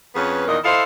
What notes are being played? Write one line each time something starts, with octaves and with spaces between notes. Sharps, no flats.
F2 B3 C#4 G#4 B4
E2 A#2 D#3 A#4 D#5
E4 A4 C5 D#5 F5